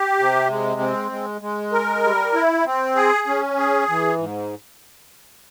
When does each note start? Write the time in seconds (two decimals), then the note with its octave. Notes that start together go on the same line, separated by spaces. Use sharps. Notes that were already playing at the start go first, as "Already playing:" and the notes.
Already playing: G4
0.19 C3
0.49 G#3
0.81 C4
1.11 G#3
1.41 G#3
1.72 A#4
2.04 G3
2.34 E4
2.65 C4
2.96 G#4
3.27 C#4
3.57 G#4
3.89 E3
4.18 G#2